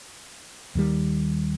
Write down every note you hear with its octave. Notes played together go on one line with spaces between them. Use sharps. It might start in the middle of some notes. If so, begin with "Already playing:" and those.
D#2 D#3 G3